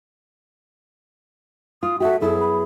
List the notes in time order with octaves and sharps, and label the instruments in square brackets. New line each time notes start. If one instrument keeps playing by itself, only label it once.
[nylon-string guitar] F4 [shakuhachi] D#6
[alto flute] F#4 [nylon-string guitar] G4 A4 [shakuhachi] E5
[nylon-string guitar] F#2 B3 E4 [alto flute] G#4 [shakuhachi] A4
[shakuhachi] B5